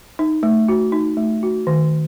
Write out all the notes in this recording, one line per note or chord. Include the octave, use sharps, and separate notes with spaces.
D#4
A3
F#4
D#4
A3
F#4
D#3